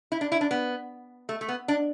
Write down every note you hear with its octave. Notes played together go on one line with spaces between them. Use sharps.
E4
D4
E4
D4
B3
A3
A3
B3
D4